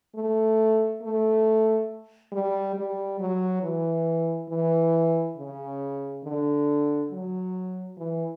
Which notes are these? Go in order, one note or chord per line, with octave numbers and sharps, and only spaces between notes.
A3
A3
G3
G3
F#3
E3
E3
C#3
D3
F#3
E3